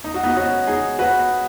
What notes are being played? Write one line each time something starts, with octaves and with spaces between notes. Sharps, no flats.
D#4
F#4
B3 D#4
C#4 F#4
D#4 G#4
F#4 B4